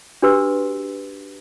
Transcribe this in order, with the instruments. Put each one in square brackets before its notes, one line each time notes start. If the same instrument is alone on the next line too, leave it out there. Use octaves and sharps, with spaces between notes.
[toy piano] D4 F#4 G4 B4 C6 E6